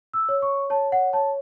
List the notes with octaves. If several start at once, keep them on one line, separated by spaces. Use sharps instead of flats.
E6
C#5
C#6
C#5 A5
F#5
C#5 A5